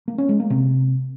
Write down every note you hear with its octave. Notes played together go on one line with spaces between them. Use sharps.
A#3
C#4
G#3
A#3
C3